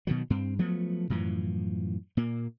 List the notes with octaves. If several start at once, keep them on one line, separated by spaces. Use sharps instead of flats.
B2 D#3 F#3
G2 C4
F3 F#3 A3 B3
F#2 A2 E3 F3
A#2 A#3